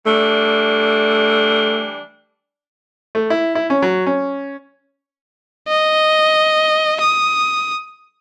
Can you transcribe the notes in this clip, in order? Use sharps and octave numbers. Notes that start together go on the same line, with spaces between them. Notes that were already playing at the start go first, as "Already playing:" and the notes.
E3 G3 A3 D4
A3
E4
E4
C#4
F#3
C#4
D#5
D#6